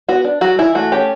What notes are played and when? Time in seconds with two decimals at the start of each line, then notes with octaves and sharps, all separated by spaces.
0.08 B3 F#4
0.24 D4
0.41 F#3 F#4
0.59 E3 E4
0.75 A3 F#4
0.92 C#4 G4